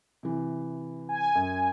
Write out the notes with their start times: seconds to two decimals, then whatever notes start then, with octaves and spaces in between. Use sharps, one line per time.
0.23 C3 E3
1.09 G#5
1.35 F#2